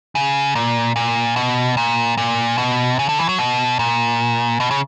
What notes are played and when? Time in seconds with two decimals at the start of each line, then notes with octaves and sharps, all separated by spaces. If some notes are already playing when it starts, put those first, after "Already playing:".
0.15 C#3
0.55 A#2
0.96 A#2
1.36 B2
1.77 A#2
2.17 A#2
2.58 B2
2.99 C#3
3.09 D3
3.18 E3
3.29 F#3
3.39 B2
3.79 A#2
4.60 B2
4.71 C#3